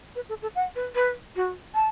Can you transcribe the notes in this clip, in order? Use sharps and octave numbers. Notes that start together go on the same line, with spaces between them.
B4
A4
A4
F#5
B4
B4
F#4
A5